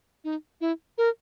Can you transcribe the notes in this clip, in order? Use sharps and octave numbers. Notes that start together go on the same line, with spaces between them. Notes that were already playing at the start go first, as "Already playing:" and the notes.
D#4
E4
A#4